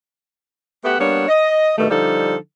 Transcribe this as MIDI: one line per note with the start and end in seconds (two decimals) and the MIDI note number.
0.85 0.97 57
0.85 0.97 59
0.85 0.97 67
0.85 0.97 76
0.85 0.97 78
1.00 1.27 55
1.00 1.27 58
1.00 1.27 59
1.00 1.27 62
1.00 1.27 73
1.28 1.72 75
1.78 1.86 43
1.78 1.86 47
1.78 1.86 51
1.78 1.86 57
1.90 2.36 50
1.90 2.36 53
1.90 2.36 55
1.90 2.36 63
1.90 2.36 69